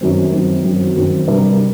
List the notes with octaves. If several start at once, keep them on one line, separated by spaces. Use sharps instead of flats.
F#2 D#3 F#3 C4
F#2 D#3 F#3 C4
F#2 D#3 F#3 C4
F#2 D#3 F#3 C4
C3 G3 D4 G4 A#4